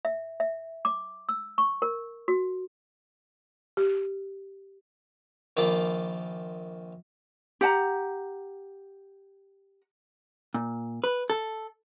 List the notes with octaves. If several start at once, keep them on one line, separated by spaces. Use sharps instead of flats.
E5
E5
D6
E6
C#6
A#4
F#4
G4
A#1 D#3 F4 B5 D6
G4 F#5 A5 A#5
A#2
B4
A4